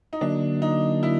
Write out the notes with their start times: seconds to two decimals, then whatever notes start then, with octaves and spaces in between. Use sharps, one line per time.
0.13 D#4
0.21 D3 F#3 A#3 D4
0.62 D#4
1.03 E4